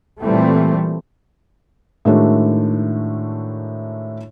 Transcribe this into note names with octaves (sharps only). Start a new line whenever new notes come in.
A#2 E3 G3 A3 C4
A2 D#3 G#3 A3 D4 F#4